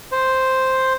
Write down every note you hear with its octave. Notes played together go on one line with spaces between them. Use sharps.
C5